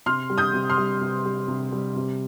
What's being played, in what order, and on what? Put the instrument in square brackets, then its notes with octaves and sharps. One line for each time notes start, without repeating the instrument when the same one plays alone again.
[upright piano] C3 C6 F6
G3
D#6 G6
C3
C6 F6
G3
C3
G3
C3
G3
C3